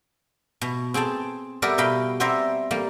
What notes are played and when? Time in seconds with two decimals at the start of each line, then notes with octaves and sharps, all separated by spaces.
0.61 B2
0.94 C4 G#4 G5 A5
1.62 G3 B3 G4 A#4 D5 E5
1.78 B2 D#5 F5 G5 B5
2.20 B3 C4 C5 D5 E5 A#5
2.71 G3 A#3